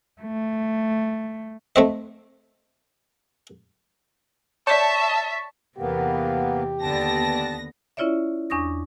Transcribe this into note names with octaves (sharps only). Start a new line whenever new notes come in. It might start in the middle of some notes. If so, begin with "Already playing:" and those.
A3
A3 C4 D#5
C#5 D5 E5 A5 C#6 A6 B6
E2 C3 A#3 B3 G4
D#2 D3 B3 D5 A5 A#6
C#4 E4 F4 C#5 D5 E5
E2 D4 C#6 D#6 A#6